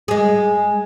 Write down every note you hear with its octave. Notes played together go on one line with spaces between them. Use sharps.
G#3 G#4